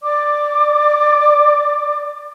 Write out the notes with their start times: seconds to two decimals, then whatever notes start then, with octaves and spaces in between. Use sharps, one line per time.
0.02 D5 D6